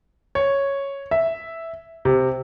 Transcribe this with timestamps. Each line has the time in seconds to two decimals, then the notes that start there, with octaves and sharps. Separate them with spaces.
0.35 C#5
1.11 E5
2.05 C3